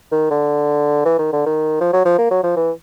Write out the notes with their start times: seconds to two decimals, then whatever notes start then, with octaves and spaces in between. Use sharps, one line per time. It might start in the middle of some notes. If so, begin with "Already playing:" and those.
0.12 D#3
0.30 D3
1.05 E3
1.19 D#3
1.32 D3
1.46 D#3
1.80 F3
1.93 F#3
2.05 F3
2.18 A#3
2.31 F#3
2.43 F3
2.56 E3